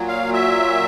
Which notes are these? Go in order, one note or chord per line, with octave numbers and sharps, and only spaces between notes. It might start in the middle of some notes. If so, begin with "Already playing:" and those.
Already playing: A#2 F#3
F5
E5